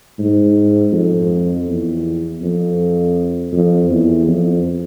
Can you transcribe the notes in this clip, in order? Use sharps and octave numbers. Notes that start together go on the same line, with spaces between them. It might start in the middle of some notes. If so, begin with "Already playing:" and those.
G#2
F2
E2
F2
F2
E2
F2